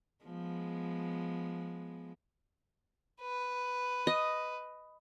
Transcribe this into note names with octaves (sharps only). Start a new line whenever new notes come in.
F3 G#3 B3
B4
D#5